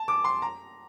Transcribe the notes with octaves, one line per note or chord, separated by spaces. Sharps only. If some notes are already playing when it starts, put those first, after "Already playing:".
Already playing: A5
D6
C6
A#5